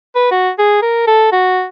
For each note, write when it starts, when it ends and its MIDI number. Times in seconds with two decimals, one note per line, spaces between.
0.16 0.29 71
0.31 0.50 66
0.59 0.79 68
0.82 1.06 70
1.07 1.28 69
1.32 1.65 66